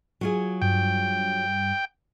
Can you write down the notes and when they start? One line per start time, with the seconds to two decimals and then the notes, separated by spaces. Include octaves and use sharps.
0.21 F#3 F4 G#4
0.62 G2 G5